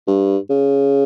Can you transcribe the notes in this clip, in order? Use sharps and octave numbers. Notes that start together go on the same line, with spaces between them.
G2
C#3